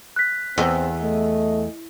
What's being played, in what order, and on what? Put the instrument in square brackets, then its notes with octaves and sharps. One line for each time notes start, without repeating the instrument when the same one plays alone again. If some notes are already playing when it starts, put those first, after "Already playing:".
[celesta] F#6 B6
[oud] E2 [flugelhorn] C4
[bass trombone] A3 [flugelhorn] D#5